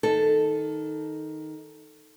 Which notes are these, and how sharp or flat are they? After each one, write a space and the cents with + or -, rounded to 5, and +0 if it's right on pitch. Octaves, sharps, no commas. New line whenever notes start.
D#3 +5 A4 +0